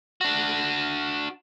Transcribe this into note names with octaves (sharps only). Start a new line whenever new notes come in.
D4 F#4